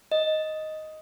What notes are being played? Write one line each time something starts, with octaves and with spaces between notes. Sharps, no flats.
D#5